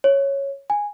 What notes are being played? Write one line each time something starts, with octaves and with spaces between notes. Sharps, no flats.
C#5
G#5